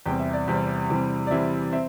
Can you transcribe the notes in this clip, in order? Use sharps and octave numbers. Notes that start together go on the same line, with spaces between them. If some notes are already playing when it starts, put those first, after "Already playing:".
E2 C3 G3 C4 G5
E5
D5
E2 C3 G3 C4
C3 E3 G3 C4
D5
C3 E3 G3 C4 E5
C4 E5